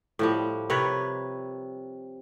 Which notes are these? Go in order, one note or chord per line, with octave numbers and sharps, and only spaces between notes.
A2 F3 G3
C3 A#4 B4 C#5